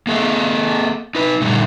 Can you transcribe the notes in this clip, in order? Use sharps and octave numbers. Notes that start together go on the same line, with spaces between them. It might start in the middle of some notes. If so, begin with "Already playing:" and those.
A#3 G#4 A4
D#4 B4
A#2 D3 D#3 G3 A3